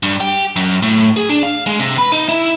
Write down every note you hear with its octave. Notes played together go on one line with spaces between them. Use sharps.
G2
G4
F#2
A2
G#4
D4
F5
G#3
C3
B4
D#4
E4